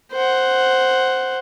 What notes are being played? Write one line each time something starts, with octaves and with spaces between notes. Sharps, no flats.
C5 F#5